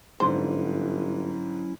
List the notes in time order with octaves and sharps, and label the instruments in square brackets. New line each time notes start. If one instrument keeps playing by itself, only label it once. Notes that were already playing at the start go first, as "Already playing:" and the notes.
[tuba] G1 [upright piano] G#2 D3 G3 [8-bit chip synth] F#3 C#4 E4 [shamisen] C5